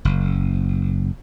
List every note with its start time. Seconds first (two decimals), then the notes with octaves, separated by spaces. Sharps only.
0.05 F#1